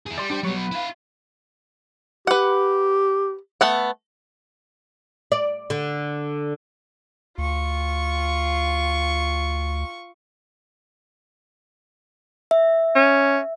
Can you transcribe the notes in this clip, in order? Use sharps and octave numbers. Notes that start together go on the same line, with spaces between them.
E4 G#4
G3 D5 C6
G3 D4 G4 C5
F#3 G3 B3 C#5
B4
E4 F5
G4 B4 F#5
A3 B3 F#5
D5
D3
D2 F4 C#6
E5
C#4